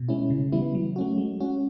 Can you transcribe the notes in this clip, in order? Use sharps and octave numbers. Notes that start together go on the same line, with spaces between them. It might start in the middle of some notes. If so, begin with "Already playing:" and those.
Already playing: B2
G#3 C#4 E4
C#3
E3 G3 B3 E4
F#3
A3 C#4 F#4
G#3
C#4 F#4